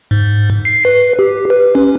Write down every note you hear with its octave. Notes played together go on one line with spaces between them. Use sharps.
G#2
C7
B4
G4
B4
C#4